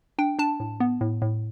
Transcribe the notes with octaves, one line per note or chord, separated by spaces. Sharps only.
D4 G5
D4 A5
A2
B3
A2
A2